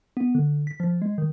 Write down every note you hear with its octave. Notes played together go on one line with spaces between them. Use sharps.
B3
D3
B6
F3
G#3
D#3